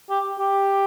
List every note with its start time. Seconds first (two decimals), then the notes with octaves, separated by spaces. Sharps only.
0.10 G4
0.39 G4